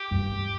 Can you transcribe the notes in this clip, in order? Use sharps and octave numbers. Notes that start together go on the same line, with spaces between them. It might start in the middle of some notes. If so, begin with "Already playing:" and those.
Already playing: G4
G2